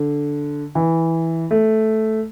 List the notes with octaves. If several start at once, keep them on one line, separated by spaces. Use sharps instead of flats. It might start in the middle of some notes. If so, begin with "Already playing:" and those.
Already playing: D3
E3
A3